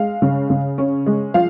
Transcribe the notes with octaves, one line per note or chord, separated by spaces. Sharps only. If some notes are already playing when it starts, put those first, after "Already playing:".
Already playing: G#3 F5
C#3
C#3
C#4
G#3
F3 F5